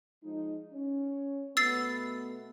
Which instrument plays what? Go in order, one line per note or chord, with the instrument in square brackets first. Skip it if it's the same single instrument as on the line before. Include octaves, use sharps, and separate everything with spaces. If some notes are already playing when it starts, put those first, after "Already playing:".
[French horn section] F3 G#3 D#4
C#4
[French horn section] B2 A3 B3 [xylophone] E6 A6 C7